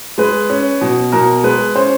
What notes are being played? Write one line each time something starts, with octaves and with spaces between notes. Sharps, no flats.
G#3 B4
C#4
B2
B2 A#4
G#3 B4
C#4 C5